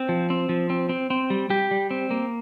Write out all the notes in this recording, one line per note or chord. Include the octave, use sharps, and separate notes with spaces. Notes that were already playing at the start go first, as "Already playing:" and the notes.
Already playing: C4
F3
C4
F3
C4
C4
C4
G3
G3 G4
G3
C4
A#3